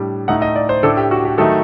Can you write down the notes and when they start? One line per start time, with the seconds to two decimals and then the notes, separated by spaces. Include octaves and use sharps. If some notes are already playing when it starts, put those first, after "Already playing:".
Already playing: A2 G3 D4
0.28 A2 A3 D#4 F#5
0.42 D#5
0.56 D5
0.69 C5
0.83 A2 A3 D4 A4
0.97 G4
1.11 F#4
1.25 G4
1.38 D#3 F#3 A3 D#4 A4